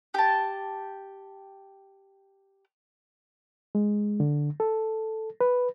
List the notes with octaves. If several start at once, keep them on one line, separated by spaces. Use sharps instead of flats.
G4 A5
G#3
D3
A4
B4